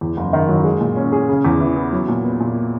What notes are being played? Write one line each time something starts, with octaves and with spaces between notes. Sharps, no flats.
E2
F#1
D#3
F#3
G#3
A#2
C#4
G#4
C#3
E2
E3
B3
F#3
A#2
B3
A#2